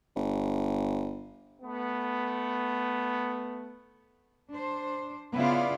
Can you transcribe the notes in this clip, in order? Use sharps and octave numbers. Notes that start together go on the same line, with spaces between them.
G1
A3 B3
D4 C5
C#3 B3 E4 F4 D5 F5